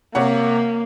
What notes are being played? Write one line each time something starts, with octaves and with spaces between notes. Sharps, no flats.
C3 A#3 C#5 F#5